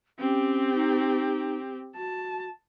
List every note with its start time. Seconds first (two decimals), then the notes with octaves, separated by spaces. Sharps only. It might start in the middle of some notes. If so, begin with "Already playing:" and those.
0.19 C4 C#4 G4
0.74 D#4
1.96 F#4 A5